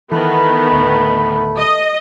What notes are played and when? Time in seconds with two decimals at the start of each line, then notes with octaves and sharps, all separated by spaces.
0.12 D#3 E3 A3 B3 B5
0.72 D2 A2
1.58 D#5